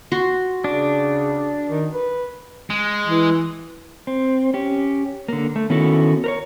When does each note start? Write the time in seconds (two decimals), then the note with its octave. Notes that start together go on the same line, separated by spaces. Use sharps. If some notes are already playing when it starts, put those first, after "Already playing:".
0.12 F#4 C6
0.64 C#3 D4
1.68 D#3
1.94 B4
2.70 G#3
3.06 E3
4.07 C4
4.54 C#4 G4
5.28 D3 A#3
5.56 A3
5.70 D#3 B3 C#4 E4 F#4 A4
6.24 A#4 B4 C#5